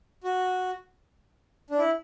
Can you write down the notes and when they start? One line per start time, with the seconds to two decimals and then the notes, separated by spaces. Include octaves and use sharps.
0.24 F#4
1.70 D4
1.78 E4